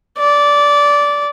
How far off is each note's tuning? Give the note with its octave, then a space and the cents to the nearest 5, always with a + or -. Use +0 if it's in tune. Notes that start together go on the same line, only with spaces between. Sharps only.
D5 -15